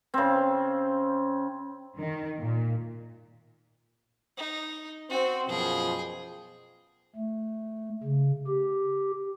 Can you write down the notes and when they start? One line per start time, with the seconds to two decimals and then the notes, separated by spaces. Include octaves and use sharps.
0.14 C#3 C4
1.98 D#3
2.40 A#2
4.37 D#4
5.10 C4 F#4 C5
5.48 F#2 B2 F3 G#4 G5
7.16 A3
8.04 C#3
8.48 G4